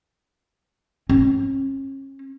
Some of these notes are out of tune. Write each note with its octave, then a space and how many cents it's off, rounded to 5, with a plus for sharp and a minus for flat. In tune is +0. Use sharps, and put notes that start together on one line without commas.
C#4 -35